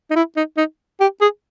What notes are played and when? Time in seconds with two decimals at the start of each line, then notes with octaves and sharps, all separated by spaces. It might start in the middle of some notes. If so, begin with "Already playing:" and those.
0.11 D#4
0.15 E4
0.36 D#4
0.57 D#4
1.00 G4
1.21 G#4